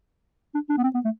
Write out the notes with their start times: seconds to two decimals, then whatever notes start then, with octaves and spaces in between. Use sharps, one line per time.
0.54 D4
0.69 D4
0.78 B3
0.83 C4
0.95 B3
1.05 A3